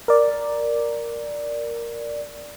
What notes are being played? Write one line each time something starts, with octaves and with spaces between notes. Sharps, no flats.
A#4 D5